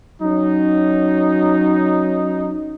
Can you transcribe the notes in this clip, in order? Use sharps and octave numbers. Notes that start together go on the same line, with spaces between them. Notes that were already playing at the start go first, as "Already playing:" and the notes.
F#3 C#4 D#4